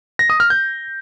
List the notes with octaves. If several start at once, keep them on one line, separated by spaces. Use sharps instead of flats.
A#6
D#6
F6
G6